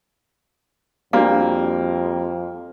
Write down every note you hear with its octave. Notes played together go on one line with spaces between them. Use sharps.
F2 G3 A#3 C4 D4 F#4 F5